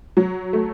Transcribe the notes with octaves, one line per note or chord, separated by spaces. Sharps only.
F#3
A3